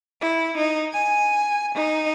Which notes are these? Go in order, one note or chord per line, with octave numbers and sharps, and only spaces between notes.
E4
D#4
G#5
D#4